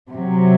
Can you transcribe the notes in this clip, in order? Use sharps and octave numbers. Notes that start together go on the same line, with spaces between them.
C3 F#3